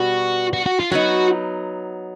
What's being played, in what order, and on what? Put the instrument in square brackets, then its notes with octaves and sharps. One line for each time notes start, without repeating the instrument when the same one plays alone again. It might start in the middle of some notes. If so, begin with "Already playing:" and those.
Already playing: [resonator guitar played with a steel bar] B2 G3 B3 [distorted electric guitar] F#4
[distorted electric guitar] F#4
F#4
F4
[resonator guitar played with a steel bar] F#3 B3 D#4 [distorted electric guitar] F#4